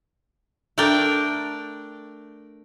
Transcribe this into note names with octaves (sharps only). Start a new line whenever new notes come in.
A3 D4 A#4 D5 G5